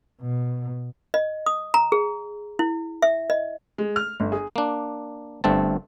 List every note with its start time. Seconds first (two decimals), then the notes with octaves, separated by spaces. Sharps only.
0.22 B2
1.14 D#5
1.46 D#6
1.74 A#5
1.92 G#4
2.59 E4
3.02 E5
3.30 D#5
3.78 G#3
3.96 F6
4.20 G1
4.32 G#4
4.56 A#3 D4
5.44 G1 G2 A3 C4 A5